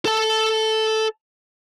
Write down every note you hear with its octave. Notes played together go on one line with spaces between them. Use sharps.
A4 A5